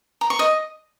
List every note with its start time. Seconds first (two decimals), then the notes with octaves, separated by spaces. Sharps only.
0.21 A#5
0.30 C#6
0.39 D#5